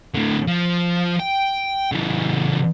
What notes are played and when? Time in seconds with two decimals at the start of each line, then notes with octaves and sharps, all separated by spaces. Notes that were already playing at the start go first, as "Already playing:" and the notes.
0.14 A2 D3
0.47 F3
1.20 G5
1.92 C#3 E3